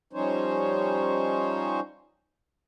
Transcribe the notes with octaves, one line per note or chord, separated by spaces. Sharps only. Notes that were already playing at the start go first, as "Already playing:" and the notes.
F3 G3 C#4 D#4 C5 C#5